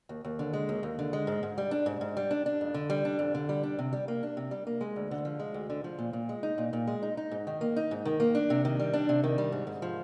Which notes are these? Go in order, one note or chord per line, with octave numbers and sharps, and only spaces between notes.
D#2
D#2
D3
G#3
D#2
D#2
D3
G#3
G#2
G#2
G3
D4
G#2
G#2
G3
D4
D4
F2
D3
G3
D4
F2
D3
G3
D4
C3
G3
A#3
D4
C3
G3
A#3
G#3
D2
D3
F3
G#3
D2
D3
F3
A#2
A#2
G#3
D#4
A#2
A#2
G#3
D#4
D#4
G#2
D#3
A#3
D#4
G#2
D#3
A#3
D4
C3
D#3
G3
D4
C3
D#3
G3
G#2
G#2
F3